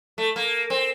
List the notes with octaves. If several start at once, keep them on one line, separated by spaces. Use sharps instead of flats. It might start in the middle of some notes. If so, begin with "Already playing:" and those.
A3
A#3
C4